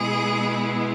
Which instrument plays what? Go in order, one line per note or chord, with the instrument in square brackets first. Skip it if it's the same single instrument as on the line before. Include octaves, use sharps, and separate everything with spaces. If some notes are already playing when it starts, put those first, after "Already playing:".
Already playing: [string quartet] B2 G#3 B3 E4 G#4